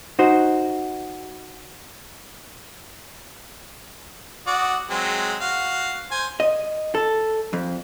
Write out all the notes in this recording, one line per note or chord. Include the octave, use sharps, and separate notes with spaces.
D#4 F#4 C5
F#4 D5 D#6
F#3 G#3 C4
F#4 F5
C5 G#5
D#5
A4
F2